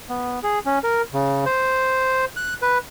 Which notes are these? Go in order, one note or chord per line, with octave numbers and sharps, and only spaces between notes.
B3
G#4
C#4
A#4
C#3
C5
F#6
B4